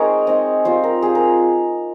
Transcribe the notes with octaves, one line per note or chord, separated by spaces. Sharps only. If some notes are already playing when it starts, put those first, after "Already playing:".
Already playing: G#3 C4 D#4 G#4 A#4 C#5 D#5
G#3 C4 D#4
G3 C4 F4 C5
A#4
G3 C4 F4 G#4
A#4